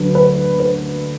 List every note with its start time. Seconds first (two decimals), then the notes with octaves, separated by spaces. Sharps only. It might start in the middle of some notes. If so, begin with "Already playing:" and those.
Already playing: D2 D3 F#3 B4
0.15 B4
0.60 B4